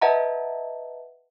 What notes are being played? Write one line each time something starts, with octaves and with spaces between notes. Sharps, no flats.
B4 D#5 E5 F#5 A5 A#5